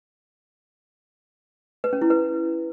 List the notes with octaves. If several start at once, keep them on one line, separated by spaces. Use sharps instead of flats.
B4
C#4
E4
B4